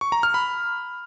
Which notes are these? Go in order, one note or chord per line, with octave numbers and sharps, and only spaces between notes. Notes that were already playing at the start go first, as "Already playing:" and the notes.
C#6
A#5
F6
B5